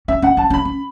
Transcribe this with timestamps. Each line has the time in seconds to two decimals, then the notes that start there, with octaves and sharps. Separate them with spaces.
0.08 C#4 E5
0.22 C#4 F#5
0.37 C#4 A5
0.50 C#4
0.54 B5
0.65 C#4